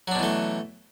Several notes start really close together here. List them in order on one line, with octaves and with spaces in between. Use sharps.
F#3 D4 B2 E3 A3